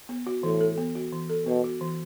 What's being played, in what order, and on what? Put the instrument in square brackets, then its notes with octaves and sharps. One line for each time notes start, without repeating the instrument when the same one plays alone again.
[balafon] B3
F#4
[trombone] A2 [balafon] E3
[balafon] A4
B3
F#4
E3
A4
[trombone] B2 [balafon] B3
[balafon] F#4
E3